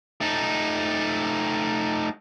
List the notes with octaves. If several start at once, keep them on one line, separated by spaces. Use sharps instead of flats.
A3 D#4